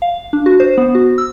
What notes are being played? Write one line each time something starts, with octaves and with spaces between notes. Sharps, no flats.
F5
D4
F#4
C5
B3
F#4
E6